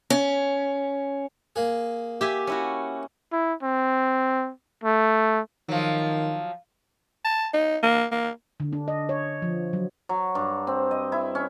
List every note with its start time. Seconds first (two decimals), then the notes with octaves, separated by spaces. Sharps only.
0.10 C#4
1.56 A#3 G#4
2.21 G4 E5 G#5
2.47 C#4 E4 F#4
3.32 E4
3.63 C4
4.84 A3
5.69 D#3 F3 F#3
7.25 A5
7.54 D#4
7.83 A#3
8.12 A#3
8.60 D3
8.73 D4
8.88 D#5
9.09 C#5
9.42 F3
9.73 F#3
10.09 F#3
10.35 G2
10.67 C4
10.91 D#5
11.12 E4
11.35 C#4